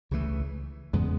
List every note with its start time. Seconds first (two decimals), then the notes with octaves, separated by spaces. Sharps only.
0.11 C#2 C#3 E3 A3
0.93 E2 C#3 G#3 B3